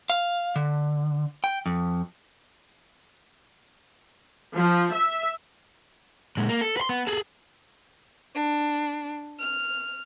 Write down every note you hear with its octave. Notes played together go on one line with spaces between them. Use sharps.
F5
D3
G5
F2
F3
E5
A#2 G#3
A#3
A4
B4 C6
B3
G#4 A4
D4
F6